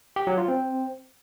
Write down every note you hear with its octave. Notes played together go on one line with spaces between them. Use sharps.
G4
F#3
F4
C4